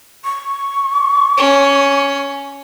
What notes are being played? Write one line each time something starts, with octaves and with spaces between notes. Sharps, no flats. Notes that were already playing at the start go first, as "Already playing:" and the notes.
C#6
C#4